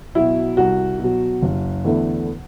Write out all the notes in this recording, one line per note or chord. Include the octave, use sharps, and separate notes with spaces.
B2 F#3 E4
C2 F#4
B2 F#3
F#1
E2 D3 A3 E4